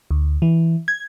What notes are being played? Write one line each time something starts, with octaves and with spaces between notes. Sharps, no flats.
D2
E3
G#6